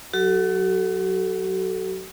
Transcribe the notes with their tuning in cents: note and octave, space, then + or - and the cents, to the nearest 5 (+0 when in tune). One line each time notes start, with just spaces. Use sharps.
F#3 +0 F#4 +40 A4 +0